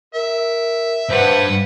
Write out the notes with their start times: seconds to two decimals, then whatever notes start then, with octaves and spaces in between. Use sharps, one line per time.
0.14 A#4 E5
1.09 G2 B4 C5 F#5